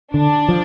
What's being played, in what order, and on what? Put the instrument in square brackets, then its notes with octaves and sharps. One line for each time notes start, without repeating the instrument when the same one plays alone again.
[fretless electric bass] D3 [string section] D4
[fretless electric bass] F3